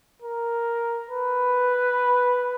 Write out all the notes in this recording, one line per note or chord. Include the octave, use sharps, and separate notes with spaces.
A#4
B4